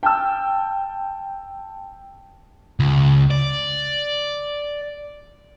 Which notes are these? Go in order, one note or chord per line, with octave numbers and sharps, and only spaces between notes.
G5 A5 E6
C#2
D5